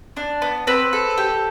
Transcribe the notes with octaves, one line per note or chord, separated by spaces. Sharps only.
D4
B3
C4 B4
A4
G4